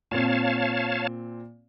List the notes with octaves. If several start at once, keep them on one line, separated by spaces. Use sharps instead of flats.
A#2 C4 C#5 F5 A5